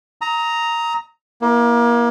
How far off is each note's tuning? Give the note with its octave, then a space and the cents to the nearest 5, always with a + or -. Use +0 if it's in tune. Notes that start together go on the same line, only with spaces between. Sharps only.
A#5 +0 D#6 +35
A#3 +30 E4 +0